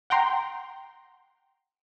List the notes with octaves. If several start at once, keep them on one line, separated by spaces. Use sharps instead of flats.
F#5 G5 A#5 C6